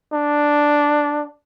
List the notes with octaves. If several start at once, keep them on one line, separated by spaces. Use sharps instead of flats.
D4